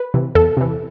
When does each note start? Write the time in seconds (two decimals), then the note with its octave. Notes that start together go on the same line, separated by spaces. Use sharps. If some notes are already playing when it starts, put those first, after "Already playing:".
Already playing: B4
0.14 C3 E3
0.35 E2 A4
0.57 C3 E3